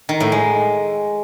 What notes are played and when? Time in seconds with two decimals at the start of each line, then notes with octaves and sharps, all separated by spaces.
0.09 D#3
0.20 A2
0.32 G#3